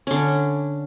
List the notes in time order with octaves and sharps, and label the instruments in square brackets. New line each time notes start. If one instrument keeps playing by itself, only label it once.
[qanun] D3 C#4